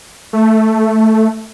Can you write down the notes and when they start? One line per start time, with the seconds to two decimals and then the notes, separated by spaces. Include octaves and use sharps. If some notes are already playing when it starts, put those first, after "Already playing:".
0.33 A3